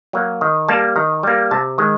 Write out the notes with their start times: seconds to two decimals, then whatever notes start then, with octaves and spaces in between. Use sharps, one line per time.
0.13 F#3 A#3
0.41 D#3
0.68 G3 A#3 A5
0.96 D#3 A#5
1.23 G3 A#3
1.51 C3 A5
1.78 D#3 G#3